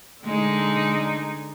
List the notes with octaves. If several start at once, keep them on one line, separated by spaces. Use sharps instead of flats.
D3 G#3 D#4